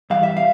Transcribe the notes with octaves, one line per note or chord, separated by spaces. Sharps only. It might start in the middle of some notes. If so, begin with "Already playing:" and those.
G2 E3 G3 F5
E5
F5